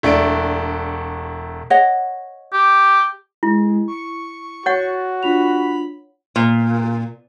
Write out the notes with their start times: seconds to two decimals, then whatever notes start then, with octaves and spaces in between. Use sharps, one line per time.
0.03 E1 A3 D4 D7
1.70 C#5 D#5 F#5
2.53 G4
3.43 G#3 E4
3.88 C#6
4.66 F#4 C#5 F#5 A6
5.23 D4 F4 B5 F7
6.36 A#2